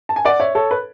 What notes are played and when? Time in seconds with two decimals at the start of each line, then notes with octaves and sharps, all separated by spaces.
0.09 A5
0.16 G#5
0.25 D5 F#5
0.40 C#5 E5
0.55 A4 C#5
0.71 B4